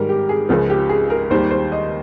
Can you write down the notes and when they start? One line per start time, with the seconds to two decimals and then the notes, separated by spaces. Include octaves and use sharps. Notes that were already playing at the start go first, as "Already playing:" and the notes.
Already playing: G#2 D#3 G3 A#4
0.09 G4
0.29 G#4
0.49 C#2 C#3 F3 A#4
0.70 G4
0.89 G#4
1.10 A#4
1.30 D#2 D#3 G3 C5
1.51 C5
1.72 D#5